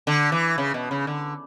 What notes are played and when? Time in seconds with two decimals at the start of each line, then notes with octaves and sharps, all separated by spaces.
0.07 D3
0.32 E3
0.58 C#3
0.74 B2
0.91 C#3
1.07 D3